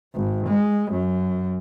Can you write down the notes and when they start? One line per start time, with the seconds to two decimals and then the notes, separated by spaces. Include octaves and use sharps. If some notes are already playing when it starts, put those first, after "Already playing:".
0.15 G#1
0.48 G#3
0.92 F#2